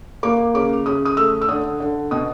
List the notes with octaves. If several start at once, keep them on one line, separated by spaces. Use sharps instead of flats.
A#3 D6
C#3 D6
C#3 D#6
D#6
A3 E6
E6
D3 D#6
D3
B2 D#6